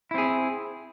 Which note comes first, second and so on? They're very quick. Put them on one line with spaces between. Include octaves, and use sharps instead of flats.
E4 C4 G#4